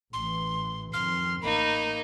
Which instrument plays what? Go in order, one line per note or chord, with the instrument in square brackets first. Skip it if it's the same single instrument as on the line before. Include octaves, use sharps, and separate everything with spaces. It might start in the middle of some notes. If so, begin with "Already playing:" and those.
[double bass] A1 E3 [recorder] C6
[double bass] F2 D#3 [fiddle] C6 [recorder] F6
[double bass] A1 [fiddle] A#3 D#4 [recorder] B5